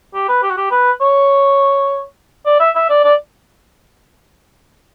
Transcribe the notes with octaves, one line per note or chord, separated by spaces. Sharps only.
G4
B4
G4
F#4
G4
B4
C#5
D5
E5
E5
D5
D5